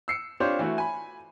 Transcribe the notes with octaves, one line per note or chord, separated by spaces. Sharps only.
E6 C7 C#7
C4 D4 F4 G4 C5 C#5
E3 A3 F#4
G#5 B5